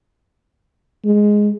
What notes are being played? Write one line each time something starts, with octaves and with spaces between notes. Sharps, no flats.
G#3